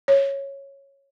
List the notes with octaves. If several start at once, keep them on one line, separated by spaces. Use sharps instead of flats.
C#5